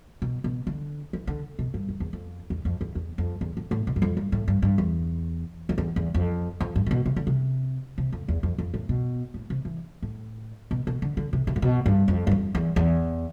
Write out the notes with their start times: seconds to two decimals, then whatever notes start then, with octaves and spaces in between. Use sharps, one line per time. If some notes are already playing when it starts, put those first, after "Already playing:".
0.22 B2
0.44 B2
0.67 D3
1.13 E3
1.27 D3
1.59 B2
1.74 G2
1.89 F2
2.00 E2
2.13 F2
2.50 E2
2.65 F2
2.81 E2
2.95 E2
3.18 F2
3.41 E2
3.57 F2
3.71 A2
3.87 B2
3.96 G2
4.02 F2
4.17 G2
4.32 A2
4.48 G2
4.62 G2
4.78 E2
5.69 F2
5.78 E2
5.96 E2
6.15 F2
6.60 F2
6.76 G2
6.86 C3
6.91 B2
7.06 C3
7.16 D3
7.27 C3
7.98 C3
8.12 F2
8.28 E2
8.43 F2
8.58 F2
8.74 A2
8.89 B2
9.34 A2
9.50 C3
9.65 E3
10.03 A2
10.71 B2
10.87 B2
11.02 D3
11.17 D3
11.33 C3
11.47 C3
11.56 A2
11.62 B2
11.86 G2
12.08 F2
12.27 G2
12.31 F2
12.55 E2
12.76 E2